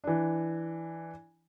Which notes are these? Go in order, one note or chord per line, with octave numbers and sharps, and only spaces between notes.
E3 D4